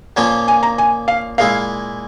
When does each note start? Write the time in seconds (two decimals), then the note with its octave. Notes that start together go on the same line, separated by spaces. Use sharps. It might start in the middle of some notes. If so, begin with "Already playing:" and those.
0.17 A#2 F3 A#3 C#4 F4
0.48 G#5
0.63 A#5
0.78 G#5
1.08 F5
1.38 A#2 G#3 E4 F5